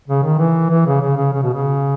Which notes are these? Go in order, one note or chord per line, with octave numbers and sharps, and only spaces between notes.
C#3
D#3
E3
E3
C#3
C#3
C#3
C#3
B2
C#3